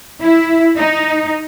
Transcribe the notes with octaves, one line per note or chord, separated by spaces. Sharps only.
E4
D#4